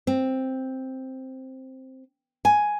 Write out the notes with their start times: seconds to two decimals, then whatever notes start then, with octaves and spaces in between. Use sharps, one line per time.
0.07 C4
2.45 G#5